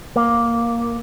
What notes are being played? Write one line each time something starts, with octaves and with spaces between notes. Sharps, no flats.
A#3